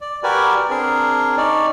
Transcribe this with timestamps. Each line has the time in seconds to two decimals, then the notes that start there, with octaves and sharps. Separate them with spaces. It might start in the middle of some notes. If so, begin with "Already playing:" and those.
0.01 D5
0.23 F#4 G4 A#4 B4 D5 G#5
0.70 C4 D4 G#4 A#4
1.37 C#4 D#4 D5